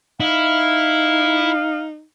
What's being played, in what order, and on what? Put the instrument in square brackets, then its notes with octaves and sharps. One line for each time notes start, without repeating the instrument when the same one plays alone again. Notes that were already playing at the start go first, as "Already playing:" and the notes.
[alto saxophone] D#4 [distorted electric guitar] E4 [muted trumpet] F5